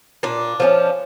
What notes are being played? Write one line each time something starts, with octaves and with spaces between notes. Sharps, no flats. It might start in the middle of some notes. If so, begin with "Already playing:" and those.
A#2 D4
F3 A#3 C#4